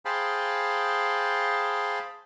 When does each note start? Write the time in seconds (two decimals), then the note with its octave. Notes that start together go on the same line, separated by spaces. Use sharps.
0.05 G#4 C5 F5 G5 A5 B5